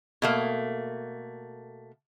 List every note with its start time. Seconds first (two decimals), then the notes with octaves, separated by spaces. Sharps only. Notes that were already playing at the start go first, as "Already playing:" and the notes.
0.22 B2 A3 A#3